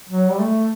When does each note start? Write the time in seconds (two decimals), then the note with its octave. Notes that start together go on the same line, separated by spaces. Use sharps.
0.09 F#3
0.30 G3
0.39 A3